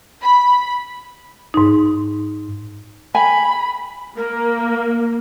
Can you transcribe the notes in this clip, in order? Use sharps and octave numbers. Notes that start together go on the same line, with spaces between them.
B5
G#2 D#4
G#5 B5
A#3 A#4